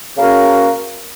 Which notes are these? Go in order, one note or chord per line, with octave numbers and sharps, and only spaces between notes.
C#3 A#3 C#4 F#4 A#4